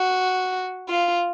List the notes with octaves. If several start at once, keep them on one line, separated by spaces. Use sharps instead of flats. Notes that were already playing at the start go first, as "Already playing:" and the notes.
Already playing: F#4
F4